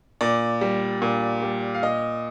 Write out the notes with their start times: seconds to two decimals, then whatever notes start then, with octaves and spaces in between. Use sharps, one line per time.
0.21 A#2 D5
0.61 G3
1.02 A#2
1.42 G3
1.75 F5
1.83 A#2 D#5